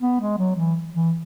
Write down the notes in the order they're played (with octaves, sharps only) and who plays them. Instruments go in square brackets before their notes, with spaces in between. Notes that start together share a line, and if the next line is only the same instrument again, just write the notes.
[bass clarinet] B3
G#3
F#3
E3
E3